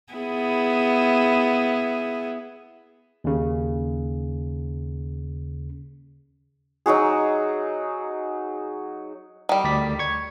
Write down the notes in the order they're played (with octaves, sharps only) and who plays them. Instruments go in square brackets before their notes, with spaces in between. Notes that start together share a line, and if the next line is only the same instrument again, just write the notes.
[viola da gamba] B3 E4 G#4
[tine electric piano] D#2 C#3
[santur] F#3 D#4 F#4 G#4
[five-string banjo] D#3 G3
[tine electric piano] D2 D5 B6
C#6 G#6